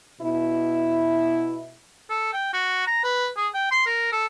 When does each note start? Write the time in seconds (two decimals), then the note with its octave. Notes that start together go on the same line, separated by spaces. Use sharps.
0.21 B2 E4
2.10 A4
2.34 G5
2.54 F#4
2.87 A#5
3.04 B4
3.37 G#4
3.54 G5
3.71 C6
3.86 A#4
4.13 A4